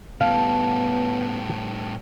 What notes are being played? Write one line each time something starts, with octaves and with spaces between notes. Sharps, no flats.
A2 G3 B3 F5 A5